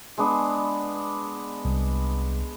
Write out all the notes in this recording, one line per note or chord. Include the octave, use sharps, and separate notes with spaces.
G#3 B3 D4
C2